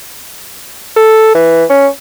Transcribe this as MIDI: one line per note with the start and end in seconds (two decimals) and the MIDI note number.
0.96 1.34 69
1.34 1.64 52
1.70 1.87 61